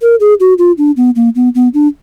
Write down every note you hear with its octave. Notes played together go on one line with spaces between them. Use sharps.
A#4
G#4
F#4
F4
D4
B3
A#3
B3
B3
D4